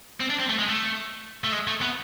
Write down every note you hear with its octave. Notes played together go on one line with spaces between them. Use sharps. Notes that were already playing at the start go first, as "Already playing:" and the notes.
C4
D4
C4
A3
G#3
A3
A3
G#3
A3
B3